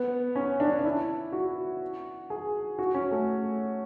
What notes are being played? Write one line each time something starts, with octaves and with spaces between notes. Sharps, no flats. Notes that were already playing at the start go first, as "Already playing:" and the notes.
Already playing: B3
C#4
D4
D4
E4
F#4
G#4
F#4
C#4
A3